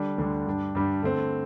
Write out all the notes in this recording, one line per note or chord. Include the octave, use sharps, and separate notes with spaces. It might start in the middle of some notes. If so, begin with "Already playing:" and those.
Already playing: D3 G3 D4
D2 D3 G3 D4
G2 G3 D4
G2 G3 D4
D3 A3 C4